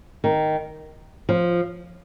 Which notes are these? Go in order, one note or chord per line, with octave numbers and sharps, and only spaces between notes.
D#3
F3